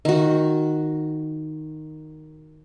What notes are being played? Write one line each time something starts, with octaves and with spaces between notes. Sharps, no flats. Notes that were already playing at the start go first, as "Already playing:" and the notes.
D#3 F#4